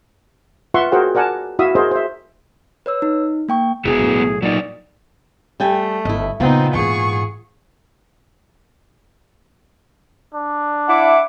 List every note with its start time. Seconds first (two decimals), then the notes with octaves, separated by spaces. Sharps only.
0.74 F4 B4 E5 F#5 C6 C#6
0.92 F#4 G#4 A#4 C5 F#5 G5
1.15 A#4 D5 F#5 G#5 A5
1.59 E4 F#4 E5 F5 D#6
1.75 F#4 G#4 A#4 C5 D#5
1.91 C5 E5
2.86 B4 C#5 E6
3.02 D#4
3.49 A#3 G5 C#6
3.85 E1 B3 E4 F#4 G#4
3.98 B1 A2
4.42 A#2 F#3 D#4 D5
5.60 G3 A3 G5 G#5
6.05 G1 E4 D#5
6.40 A#2 C#3 B3 C4 D#4 F4
6.74 E2 G#2 G#4 C#6
10.34 D4
10.88 E4 F#5 D6